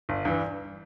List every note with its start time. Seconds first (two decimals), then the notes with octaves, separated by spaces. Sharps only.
0.09 G1
0.25 G2 E3